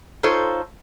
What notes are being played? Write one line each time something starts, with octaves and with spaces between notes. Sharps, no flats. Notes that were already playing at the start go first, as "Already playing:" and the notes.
D#4 F4 A4 C5 C#5